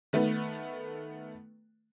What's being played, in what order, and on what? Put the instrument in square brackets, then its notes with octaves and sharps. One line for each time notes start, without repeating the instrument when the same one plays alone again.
[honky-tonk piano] D#3 A3 B3 B4